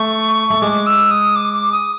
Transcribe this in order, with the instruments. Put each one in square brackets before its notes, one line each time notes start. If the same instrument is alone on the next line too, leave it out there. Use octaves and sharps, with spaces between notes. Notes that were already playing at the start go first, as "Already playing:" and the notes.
Already playing: [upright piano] A3 [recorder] C#6
[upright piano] A3
[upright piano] G#3 [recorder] D6
[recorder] E6
D#6
D6
D6
D#6